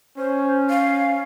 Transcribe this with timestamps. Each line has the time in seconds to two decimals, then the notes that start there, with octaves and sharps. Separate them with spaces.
0.18 C#4 C5
0.70 F5